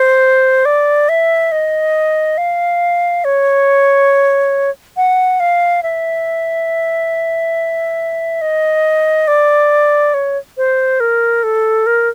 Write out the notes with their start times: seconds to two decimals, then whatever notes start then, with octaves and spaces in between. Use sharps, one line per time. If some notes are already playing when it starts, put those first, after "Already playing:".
Already playing: C5
0.65 D5
1.09 E5
1.52 D#5
2.38 F5
3.25 C#5
4.97 F#5
5.40 F5
5.83 E5
8.42 D#5
9.28 D5
10.14 C#5
10.57 C5
11.00 A#4
11.43 A4
11.86 A#4